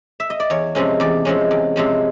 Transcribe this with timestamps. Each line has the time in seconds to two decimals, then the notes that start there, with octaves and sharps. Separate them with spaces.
0.20 E5
0.30 D#5
0.40 D5
0.50 E2 C#5
0.75 C3 F3 G#3 C#4
1.00 E2 D5
1.25 C3 F3 G#3 C#4
1.51 E2
1.76 C3 F3 G#3 C#4